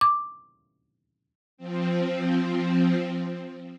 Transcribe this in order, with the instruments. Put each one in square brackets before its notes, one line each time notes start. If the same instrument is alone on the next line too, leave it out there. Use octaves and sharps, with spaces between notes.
[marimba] D6
[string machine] F3 C4